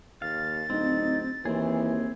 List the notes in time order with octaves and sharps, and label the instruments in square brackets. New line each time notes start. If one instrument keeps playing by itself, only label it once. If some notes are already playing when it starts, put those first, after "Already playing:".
[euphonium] D#2 [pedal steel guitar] F5 [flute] A6
[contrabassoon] D1 [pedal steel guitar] C4 [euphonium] D#4
[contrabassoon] D#2 [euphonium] E3 [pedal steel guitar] C4 G#4